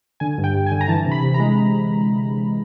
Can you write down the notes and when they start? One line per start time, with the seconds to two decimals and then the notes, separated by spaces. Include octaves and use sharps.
0.20 D3 G#5
0.38 G2
0.44 G5
0.54 G2
0.66 G#5
0.71 D3
0.81 A#5
0.88 E3 A5
1.05 C3
1.11 B5
1.22 C3
1.34 A#5
1.40 G#3